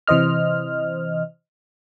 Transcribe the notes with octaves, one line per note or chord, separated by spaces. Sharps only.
C3 E3 C5 D#5 F6